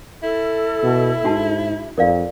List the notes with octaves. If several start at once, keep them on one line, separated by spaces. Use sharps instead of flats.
E4 A4
B2
G#2 D4 F#4 A5
F2 A#4 D5 F5